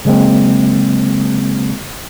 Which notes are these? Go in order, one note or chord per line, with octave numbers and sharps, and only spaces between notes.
C#3 F#3 G#3 A#3 C4